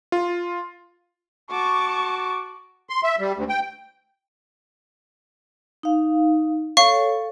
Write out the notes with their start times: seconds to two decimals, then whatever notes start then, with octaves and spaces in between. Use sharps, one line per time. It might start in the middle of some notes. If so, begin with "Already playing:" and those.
0.12 F4
1.51 F#4 A5 C#6 D6
2.90 C6
3.03 E5
3.19 G3
3.36 D2
3.49 G5
5.83 D#4 F5
6.77 A4 C#5 F5 C#6